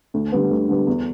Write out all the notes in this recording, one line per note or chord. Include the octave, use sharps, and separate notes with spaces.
D2
D3 G3 B3
D2
D3 G3 B3
E2